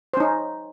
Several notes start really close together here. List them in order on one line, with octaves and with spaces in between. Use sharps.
C5 C#4 D#4